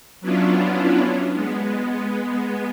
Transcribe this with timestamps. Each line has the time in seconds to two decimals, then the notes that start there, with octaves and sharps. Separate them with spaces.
0.21 F#3 B3 C#4 D4 E4 F4
1.34 G#3 B3